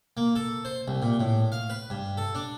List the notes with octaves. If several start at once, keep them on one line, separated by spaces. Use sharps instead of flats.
A#3
A4
C5
C2
A#2
A2
F5
B4
G2
A4
D4